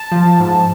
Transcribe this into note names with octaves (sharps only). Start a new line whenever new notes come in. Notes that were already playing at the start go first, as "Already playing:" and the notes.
Already playing: A5
F3
G#2